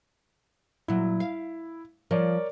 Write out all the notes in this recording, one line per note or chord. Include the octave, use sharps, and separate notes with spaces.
A#2 F#3 E4
F5
F3 A#4 C#5 D5